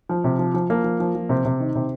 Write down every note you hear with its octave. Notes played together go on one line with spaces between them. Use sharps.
F3
C3
F3
F3
F3 A#3
F3
F3
F3
C3 C4
C3
D#3
C3